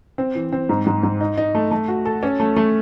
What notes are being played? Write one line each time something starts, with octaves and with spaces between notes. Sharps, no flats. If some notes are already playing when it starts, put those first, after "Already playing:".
C4
E3
C4
G#2
G#2
G#2
D#4
D#4
A3
A3
F#4
A4
C#4
A3
A3